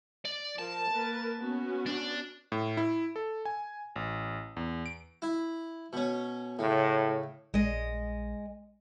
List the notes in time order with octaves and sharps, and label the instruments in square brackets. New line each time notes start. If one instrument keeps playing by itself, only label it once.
[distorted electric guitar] D5
[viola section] F3 A#4 [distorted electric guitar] A5
[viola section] A#3 A#4 B4
B3 C#4 F#4
[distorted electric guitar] D4
[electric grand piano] A2
E4
A4
G#5
A1
E2
D7
[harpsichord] E4
B2 C#4
[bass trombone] A2 [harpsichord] C#3
[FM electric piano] A#1 [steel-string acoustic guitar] G#3 D#5